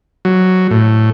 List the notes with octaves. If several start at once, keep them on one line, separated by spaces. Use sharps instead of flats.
F#3
A2